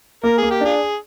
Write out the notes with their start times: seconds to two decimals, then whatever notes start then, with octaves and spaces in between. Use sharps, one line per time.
0.23 A#3 A#4
0.38 A#3 G#4
0.51 G4
0.61 D4 F4 G#4